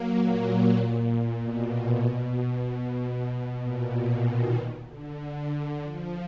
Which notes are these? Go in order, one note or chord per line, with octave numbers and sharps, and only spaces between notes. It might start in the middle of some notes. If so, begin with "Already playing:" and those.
Already playing: F#3 A#3
A#2
B2
B2
A#2
B2
D#3
D3
D3
D3
F3